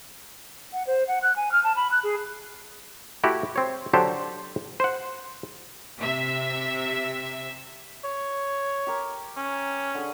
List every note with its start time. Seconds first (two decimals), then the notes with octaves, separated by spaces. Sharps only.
0.73 F#5
0.87 C5
1.08 F#5
1.23 F#6
1.36 G#5
1.52 F6
1.64 A5
1.76 B5
1.91 F#6
2.03 G#4
3.24 A3 E4 F#4 G4
3.56 C4 C#5
3.93 D3 F#3 G4 A4 C5
4.80 C5 F#5
6.00 C3 E5
8.04 C#5
8.87 G4 A#4
9.37 C#4
9.95 D3 G#4